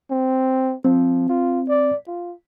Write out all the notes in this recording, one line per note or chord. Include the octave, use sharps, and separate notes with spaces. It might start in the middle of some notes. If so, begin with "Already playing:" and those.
C4
F3 C4
F4
D5
F4